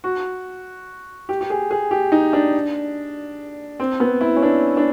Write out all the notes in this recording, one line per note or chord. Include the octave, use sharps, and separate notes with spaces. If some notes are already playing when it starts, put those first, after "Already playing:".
F#4
G4
G4
G#4
G#4
G4
D#4
D4
C4
B3
E4
C#4
D4
D4